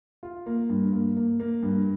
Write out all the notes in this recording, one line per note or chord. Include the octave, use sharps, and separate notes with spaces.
F4
A#3
G2
A#3
A#3
A#3
G2